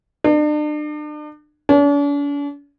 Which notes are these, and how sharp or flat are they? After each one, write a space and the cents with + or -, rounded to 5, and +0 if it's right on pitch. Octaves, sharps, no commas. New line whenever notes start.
D4 +40
D4 -45